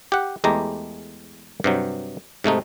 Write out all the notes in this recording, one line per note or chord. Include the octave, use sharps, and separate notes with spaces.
G4 F#5
E2 G#3 A3 G4 A#5
G2 C3 F#3
G#2 C3 A3 D#4